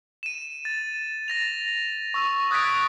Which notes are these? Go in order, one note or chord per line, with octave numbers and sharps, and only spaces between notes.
D#7 E7
A6
A6 A#6 F7
C#6 E6
D#6 F#6 G#6 A6 B6 D7